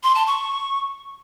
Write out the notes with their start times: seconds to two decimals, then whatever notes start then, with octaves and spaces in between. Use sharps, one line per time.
0.03 C6
0.15 A5
0.27 C#6